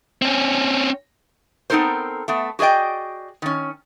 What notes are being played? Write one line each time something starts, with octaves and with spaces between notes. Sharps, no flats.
C4 C#4
B3 C4 D#4 A4 A#4 C5
A3 B3
F#4 G#4 D5 D#5 G5
D#3 C#4